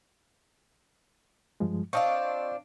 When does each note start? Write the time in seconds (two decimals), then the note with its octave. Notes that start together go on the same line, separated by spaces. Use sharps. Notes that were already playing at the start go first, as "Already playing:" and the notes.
1.60 G2 F3 G#3
1.93 C4 D4 F4 D#5 F5 C#6